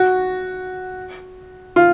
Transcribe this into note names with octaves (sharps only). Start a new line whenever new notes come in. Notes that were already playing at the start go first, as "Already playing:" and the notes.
Already playing: F#4
F4